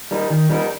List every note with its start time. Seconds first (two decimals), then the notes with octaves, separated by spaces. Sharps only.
0.11 G3 D#4 A#4
0.30 D#3
0.49 G3 D#4 A#4